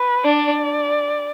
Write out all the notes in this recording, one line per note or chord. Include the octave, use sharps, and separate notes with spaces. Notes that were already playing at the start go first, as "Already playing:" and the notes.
Already playing: B4
D4 D5